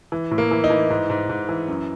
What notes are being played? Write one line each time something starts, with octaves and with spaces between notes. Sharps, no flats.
E3
A2
A#3
E3
D#4
E3
G#2
G#2
G#2
E3
F#2